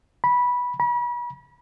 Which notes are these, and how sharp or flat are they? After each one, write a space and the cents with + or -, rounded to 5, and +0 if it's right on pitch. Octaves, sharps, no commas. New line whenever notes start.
B5 -15
B5 -40